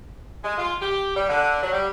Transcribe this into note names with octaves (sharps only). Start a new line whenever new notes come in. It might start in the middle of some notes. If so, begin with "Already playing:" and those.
G#3
F4
G4
G3
D3
F#3
G3